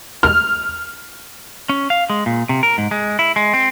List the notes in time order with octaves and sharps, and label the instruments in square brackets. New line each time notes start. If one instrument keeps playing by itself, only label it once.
[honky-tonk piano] F6
[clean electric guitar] C#4
F5
G#3
A#2
C3
A#4
G#2
G#3
E4
G#3
C4